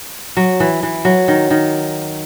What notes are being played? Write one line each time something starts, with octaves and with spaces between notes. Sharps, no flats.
F#3
E3
E3
F#3
D#3
D#3